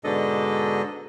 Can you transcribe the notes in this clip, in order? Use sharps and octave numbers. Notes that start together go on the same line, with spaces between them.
G#2 B2 D3 D4 A4 D#5